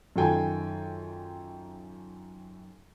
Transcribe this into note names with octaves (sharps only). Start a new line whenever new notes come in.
F#2 D#3 F4 A4 G5 G#5